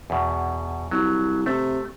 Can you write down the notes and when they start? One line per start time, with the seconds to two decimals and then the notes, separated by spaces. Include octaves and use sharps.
0.10 E2 B2
0.91 C2 F#3
1.46 C3 A3